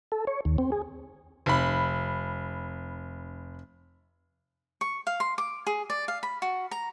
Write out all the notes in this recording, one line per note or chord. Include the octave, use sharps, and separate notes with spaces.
A4
C#5
D#2
C4
G#4
F1 B5
C#6
F5
C6
D6
G#4
D5
F5
B5
F#4
A#5